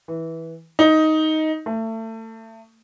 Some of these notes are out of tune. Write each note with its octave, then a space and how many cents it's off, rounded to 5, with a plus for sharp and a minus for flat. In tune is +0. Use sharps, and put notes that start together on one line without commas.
E3 -15
D#4 +10
A3 +30